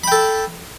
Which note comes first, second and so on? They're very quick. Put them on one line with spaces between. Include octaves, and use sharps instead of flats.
B5 G5 A4